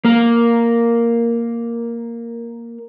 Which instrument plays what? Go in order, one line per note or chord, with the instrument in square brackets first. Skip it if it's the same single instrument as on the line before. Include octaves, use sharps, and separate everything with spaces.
[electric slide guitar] A#3 A#4